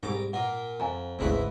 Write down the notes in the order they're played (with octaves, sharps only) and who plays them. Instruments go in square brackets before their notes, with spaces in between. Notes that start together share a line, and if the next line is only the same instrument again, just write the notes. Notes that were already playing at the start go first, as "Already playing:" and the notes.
[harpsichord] C2 A#5 D6 [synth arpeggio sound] G#2
[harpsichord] A#2 A#4 [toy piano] F#5
[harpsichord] F2 [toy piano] F5 G#5 A#5
[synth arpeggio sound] G#1 D2 C#3 [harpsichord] G#2 E4 B4